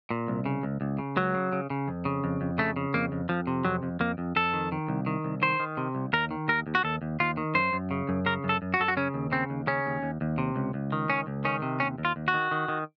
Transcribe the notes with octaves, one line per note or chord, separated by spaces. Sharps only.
A#2
C2
C#3
C#2
C#2
C#3
C#2 F#3
C#3
C#3
C#3
F2
C#3
F2
F2
C#3 A3
C#3
F2 A#3
F2
F2 F3
C3
F2 F#3
F2
F2 A#3
F2
F2 A4
D#3
D#3
C2
D#3
C2
D#3 C5
D#3
C3
C2
D#2 A#4
D#3
D#2 A#4
D#2
F#4
D#2 A4
D#2
D#2 F4
D#3
F#2 C5
F#2
C#3
F#2
C#3 A#4
F#2
A4
F#2
F#4
F#2 A4
F#4
C#3 C#4
D#2
C#3 C4
D#2
C#3 C#4
D#2
D#2
D#2
C3
C#2
C#2
D#3
C#2 C#4
C#2
D#3 C#4
C3
D#2 C#4
D#2
F4
D#2
F#4
D#3
D#3
D#3